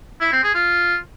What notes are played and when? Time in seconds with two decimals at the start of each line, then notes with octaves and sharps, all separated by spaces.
0.21 E4
0.32 C4
0.43 G#4
0.55 F4